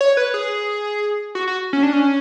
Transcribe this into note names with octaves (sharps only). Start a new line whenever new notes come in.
C#5
B4
G#4
F#4
F#4
C#4
D4
C#4